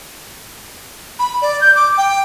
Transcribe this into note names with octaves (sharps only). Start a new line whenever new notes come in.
B5
D5
G6
D6
G5